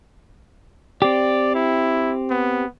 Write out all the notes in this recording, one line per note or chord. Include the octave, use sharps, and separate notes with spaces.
C4 G4 D5
E4
B3